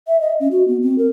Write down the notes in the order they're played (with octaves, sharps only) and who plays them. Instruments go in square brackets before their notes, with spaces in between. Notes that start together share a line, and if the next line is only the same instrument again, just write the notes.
[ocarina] E5
D#5
C#4
F#4
B3
C4
A#4